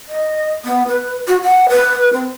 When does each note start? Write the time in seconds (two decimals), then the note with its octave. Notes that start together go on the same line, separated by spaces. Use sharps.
0.08 D#5
0.65 B3
0.88 B4
1.27 F#4
1.43 F#5
1.69 B4
2.13 C4